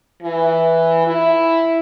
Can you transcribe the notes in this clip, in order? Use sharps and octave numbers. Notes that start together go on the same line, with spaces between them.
E3
E4